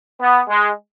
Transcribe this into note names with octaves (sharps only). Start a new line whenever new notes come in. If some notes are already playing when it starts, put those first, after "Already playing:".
B3
G#3